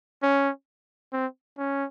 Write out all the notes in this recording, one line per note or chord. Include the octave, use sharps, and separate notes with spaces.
C#4
C4
C#4